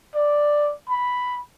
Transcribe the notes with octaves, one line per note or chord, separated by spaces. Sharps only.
D5
B5